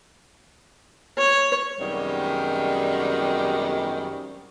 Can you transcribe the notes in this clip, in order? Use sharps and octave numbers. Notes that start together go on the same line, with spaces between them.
C#5
F#2 C3 D#3 G3 G#3 B3